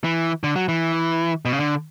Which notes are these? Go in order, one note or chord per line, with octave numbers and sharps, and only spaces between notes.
E3
D3
F#3
E3
B2
C#3
D3